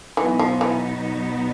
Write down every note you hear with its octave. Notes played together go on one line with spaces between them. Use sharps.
B2 E3 F#3 B3 D#4
F3
E3